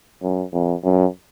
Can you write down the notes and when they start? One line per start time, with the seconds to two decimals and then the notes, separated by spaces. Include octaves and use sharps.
0.22 F#2
0.53 F2
0.84 F#2